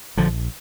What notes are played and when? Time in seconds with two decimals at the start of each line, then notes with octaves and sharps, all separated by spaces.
0.17 A#1 D3 F3